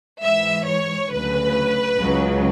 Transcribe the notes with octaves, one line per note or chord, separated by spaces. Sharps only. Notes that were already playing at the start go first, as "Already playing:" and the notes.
G#2 E3 E5
C#5
D2 C#3 F#3 B4
C#2 C#3 F#3